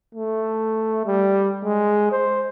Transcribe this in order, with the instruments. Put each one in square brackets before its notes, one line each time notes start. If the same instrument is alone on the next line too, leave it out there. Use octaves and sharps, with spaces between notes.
[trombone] A3
G3
G#3
C5